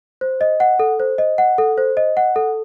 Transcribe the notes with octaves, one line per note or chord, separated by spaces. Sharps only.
C5
D#5
F#5
A4
C5
D#5
F#5
A4
C5
D#5
F#5
A4